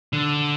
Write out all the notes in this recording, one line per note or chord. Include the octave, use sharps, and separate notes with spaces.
D3